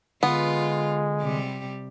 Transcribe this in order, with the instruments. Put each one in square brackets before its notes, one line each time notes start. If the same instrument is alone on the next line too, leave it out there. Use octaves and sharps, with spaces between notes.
[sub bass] D3 [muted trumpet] G#3 [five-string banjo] B3 [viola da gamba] F4
[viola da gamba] C3 G3 G4